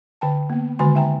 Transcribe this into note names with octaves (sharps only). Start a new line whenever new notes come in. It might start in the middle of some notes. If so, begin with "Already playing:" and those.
D3 G5 A5
A#3 B3
D3 D#3 G#3 F#4 G#5 C6
D#4 E5 G5 A#5